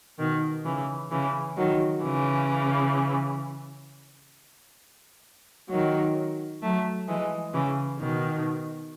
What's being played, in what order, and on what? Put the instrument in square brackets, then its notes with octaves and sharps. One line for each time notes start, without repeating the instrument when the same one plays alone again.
[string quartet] B2 D#3
C#3 E3
C#3 E3
D#3 F#3
C#3 E3
D#3 F#3
F#3 A3
E3 G#3
C#3 E3
B2 D#3